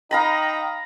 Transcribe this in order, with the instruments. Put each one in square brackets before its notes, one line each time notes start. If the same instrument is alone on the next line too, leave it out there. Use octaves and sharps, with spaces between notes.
[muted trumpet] D#4 [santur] F5 A#5 B5 [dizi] G5